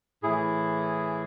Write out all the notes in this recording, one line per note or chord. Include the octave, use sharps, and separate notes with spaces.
A2 E3 E4 G#4